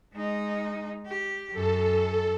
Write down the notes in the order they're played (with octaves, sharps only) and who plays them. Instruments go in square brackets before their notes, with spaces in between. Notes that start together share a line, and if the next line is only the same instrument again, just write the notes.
[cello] G#3 D#4
G4
[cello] F#2 [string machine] A4